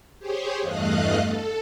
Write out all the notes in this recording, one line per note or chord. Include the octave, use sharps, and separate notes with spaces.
G4 G#4 C5 C#5
E2 G2 A3 D#5 F5 F#6
A4